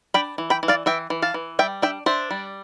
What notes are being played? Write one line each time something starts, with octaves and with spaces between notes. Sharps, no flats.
D4 G5 B5
E3
G5 B5
E3
D5 F5
E3 E5 G5
E3
F5 A5
E3
G3 E5 G5
D4 E5 G5
D4 C5 E5
G3